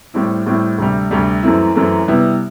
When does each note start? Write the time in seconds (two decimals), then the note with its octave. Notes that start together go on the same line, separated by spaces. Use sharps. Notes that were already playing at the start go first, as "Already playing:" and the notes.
0.14 A2 G3 C4 E4
0.46 A2 G3 C4 E4
0.78 D2 C3 G3
1.11 D2 C3 G3
1.43 F#2 E3 A3 C4 E4
1.75 F#2 E3 A3 C4 E4
2.08 C3 G3 B3 E4